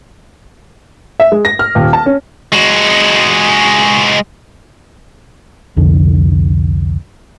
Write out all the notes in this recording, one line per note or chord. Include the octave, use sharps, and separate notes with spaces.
E5
G#3
A#6
F6
D#1
A5
C#4
G#3 F#4
C2 F2 D3